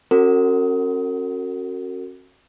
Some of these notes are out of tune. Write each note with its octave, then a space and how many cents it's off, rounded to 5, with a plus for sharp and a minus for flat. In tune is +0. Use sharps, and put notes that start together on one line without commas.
C#4 -40 F#4 +0 A#4 -45